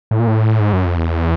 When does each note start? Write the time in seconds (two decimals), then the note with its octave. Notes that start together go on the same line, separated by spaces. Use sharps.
0.11 A2
0.20 A#2
0.27 A2
0.60 G#2
0.73 F#2
0.85 F2
0.97 E2